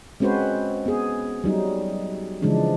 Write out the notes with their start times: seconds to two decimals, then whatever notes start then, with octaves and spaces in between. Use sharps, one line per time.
0.20 G#3 C4 C#4 F#4 B4 C5
0.86 B3 G#4
1.44 F#3 G3 D#4
2.42 C#3 E3 F3 G#3 D4